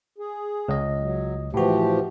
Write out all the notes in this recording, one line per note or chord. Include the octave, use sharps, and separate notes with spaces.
G#4
C#2 D#5
F#3
A2 E3 F3 F#4 G4